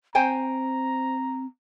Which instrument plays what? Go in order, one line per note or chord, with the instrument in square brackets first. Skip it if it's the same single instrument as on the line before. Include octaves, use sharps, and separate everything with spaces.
[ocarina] C4 [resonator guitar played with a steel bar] C5 G5 G#5 [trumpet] A#5